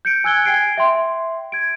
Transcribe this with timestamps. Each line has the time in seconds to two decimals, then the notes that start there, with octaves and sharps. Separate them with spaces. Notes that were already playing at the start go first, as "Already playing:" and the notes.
0.05 G6 C#7 D7
0.24 G#5 E6 F#6 G#6 C#7 G7
0.45 G5 G#5 G#6 C7 D7
0.77 E5 G5 C6
1.52 G#6 D7